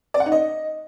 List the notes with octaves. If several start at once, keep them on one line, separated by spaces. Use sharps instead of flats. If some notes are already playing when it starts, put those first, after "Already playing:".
D5
F#5
D#4
D#5